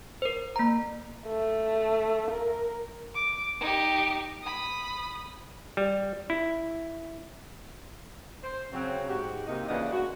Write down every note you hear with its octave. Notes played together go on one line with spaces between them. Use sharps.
A#4 C5
A#3 A#5
A3
A#4
D6
D#4 G4
B5 D#6
G3
E4
C5
C#3 F#3 C4
G#2 F#4 G4
C3 A#3 D#4
A#2 C#3 E3 D4 D#5 F#5
D2 A#2 G#3 F#4